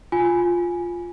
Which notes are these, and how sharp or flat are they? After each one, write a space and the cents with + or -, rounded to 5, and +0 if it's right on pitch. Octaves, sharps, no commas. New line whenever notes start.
F4 +0 G#5 +0